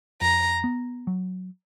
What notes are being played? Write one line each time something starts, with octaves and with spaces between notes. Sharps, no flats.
F2 A#5
B3
F#3